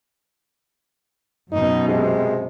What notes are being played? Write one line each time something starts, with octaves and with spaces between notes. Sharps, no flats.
F#2 B2 D#4
C3 G#3